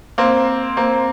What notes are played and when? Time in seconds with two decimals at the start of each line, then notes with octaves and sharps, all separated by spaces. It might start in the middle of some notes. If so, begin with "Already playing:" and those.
0.18 A#3 C4
0.77 A#3 C4